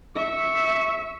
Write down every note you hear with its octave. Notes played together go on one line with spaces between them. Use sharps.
E5 C#6